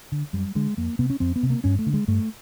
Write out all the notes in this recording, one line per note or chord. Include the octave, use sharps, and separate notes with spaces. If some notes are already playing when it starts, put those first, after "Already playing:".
D3
F#2 G3
D3 G#3
F2 A#3
C3 B3
C#4
F2 C4
B3
C3
A#3
G2 C#4
A3
D3
G#3
G2 A3